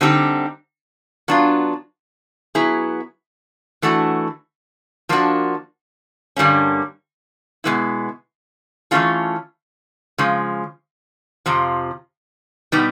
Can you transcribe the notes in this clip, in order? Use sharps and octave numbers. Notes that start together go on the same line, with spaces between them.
D3 G3 C4 D#4 G4
F#3 B3 D4 F4
F#3 B3 E4 G#4
E3 A3 D4 F#4
F3 A#3 D4 F#4
G2 D3 G3 A#3 C#4
B2 G#3 B3 E4
E3 A3 C#4 F4 G#4
C#3 F3 G#3
F2 C3 F3
B2 G3 B3 D#4 G4